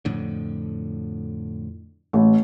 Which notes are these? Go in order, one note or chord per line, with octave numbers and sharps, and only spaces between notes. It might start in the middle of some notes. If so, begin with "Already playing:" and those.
F2 A2 D3
A1